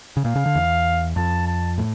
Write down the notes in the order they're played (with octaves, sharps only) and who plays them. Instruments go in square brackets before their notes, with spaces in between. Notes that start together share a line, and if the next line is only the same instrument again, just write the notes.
[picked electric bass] C#3
[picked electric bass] A#2 [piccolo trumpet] F5
[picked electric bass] C#3
D3
E2
[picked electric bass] F2 [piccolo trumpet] A5
[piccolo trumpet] A5
[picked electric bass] A2